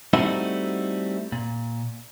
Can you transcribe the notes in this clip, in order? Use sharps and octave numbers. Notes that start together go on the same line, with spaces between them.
G3 A3 C4 D#4 E4 F#4
A#2